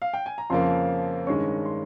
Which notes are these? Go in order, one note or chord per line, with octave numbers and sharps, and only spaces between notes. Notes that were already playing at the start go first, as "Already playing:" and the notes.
F5
G5
G#5
A#5
F2 C#3 F3 A#3 C6
G2 D#3 G#3 C#4 C#6
C6